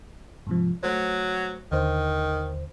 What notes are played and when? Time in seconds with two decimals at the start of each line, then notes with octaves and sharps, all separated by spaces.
0.47 G#2 C3 F3
0.83 F#3 A3 C5
1.71 D#2 D3 D#3 C5